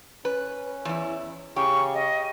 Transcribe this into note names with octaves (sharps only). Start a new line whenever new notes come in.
C#4 B4
E2 E4
C#3 G4 C#6
D#5